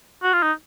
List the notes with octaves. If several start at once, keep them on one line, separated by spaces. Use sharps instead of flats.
F#4
F4
D#4